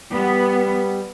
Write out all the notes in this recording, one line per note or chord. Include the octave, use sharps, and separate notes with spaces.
G3 B3